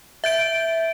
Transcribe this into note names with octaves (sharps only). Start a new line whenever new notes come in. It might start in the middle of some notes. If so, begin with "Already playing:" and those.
E5 G6 D7